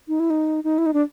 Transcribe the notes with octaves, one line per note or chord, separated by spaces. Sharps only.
D#4
E4
D#4
D#4
E4
D#4
D4